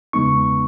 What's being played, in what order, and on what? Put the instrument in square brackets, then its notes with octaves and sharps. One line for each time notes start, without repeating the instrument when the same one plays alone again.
[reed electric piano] E2 C#3 G#3 B3 D#4 C#6